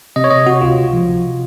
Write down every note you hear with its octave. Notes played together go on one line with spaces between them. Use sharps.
C3 D#5
C#5
C3 D#5
C3 F#4
C#2 F4
C#2
F3
C3